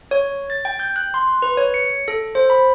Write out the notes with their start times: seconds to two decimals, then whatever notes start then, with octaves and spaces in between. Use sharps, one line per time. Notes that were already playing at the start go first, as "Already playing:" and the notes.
0.11 C#5
0.50 A6
0.65 G5
0.80 G6
0.96 F#6
1.14 C6
1.42 B4
1.57 C#5
1.74 C#7
2.08 A4
2.35 C5
2.50 B5